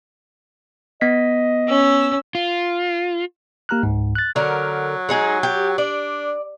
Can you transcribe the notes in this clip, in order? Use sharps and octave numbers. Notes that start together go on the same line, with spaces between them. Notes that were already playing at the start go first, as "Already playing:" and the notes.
B3 D#5 B6
C#4 E6
F4
A#3 G4 A#5 F6 F#6
C#2 G#2
F#6 A6
D3 F#3 A#4
G#3 D#4 G#4
G4
D4 D5